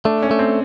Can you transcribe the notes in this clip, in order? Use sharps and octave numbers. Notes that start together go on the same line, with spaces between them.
A3 D4
C#4
A3
C4